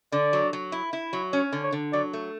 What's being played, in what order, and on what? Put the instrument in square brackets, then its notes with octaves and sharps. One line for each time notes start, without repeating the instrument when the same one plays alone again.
[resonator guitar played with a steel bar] D3 [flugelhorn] D5
[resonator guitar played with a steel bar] F#3
F#3
E4
E4
F#3
[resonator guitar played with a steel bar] C#4 [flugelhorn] C#5
[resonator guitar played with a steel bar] D3
[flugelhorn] C#5
[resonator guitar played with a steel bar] D3
[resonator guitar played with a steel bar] F#3 [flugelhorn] D5
[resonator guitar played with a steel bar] A3